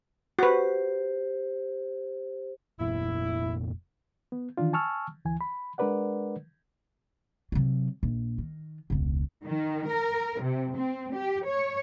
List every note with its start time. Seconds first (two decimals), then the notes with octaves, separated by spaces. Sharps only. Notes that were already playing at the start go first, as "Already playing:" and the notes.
0.39 F#4 G4 B4 C5
2.80 F1 A#2 E4
4.32 B3
4.57 D#3 E3 D4 F4
4.73 G#5 A5 C#6 E6 F6
5.25 D2 E3 G#5
5.41 B5
5.78 G#3 D4 A#4 B4 D5 F#5
7.52 C3 F#3
8.03 A#1
8.38 D#3
8.90 E1 C#2
9.44 D#3
9.90 A#4
10.42 C3
10.77 C4
11.14 G4
11.47 C#5